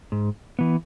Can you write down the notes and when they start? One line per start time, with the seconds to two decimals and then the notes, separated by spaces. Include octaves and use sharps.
0.12 G#2
0.59 E3 B3